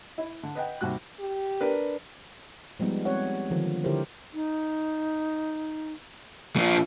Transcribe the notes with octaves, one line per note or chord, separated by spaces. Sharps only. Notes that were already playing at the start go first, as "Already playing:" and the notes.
E4
D3
B4 D#5 F#5 G5
D#2 C3 G3 F#4 F#6
G4
D4 A#4 B4
F3 G3 G#3 B3 D#4
G#3 C4 G4 C#5 F#5
D3 D#3 F3
D3 E4 G4 A#4 C5 C#5
D#4
A#2 F3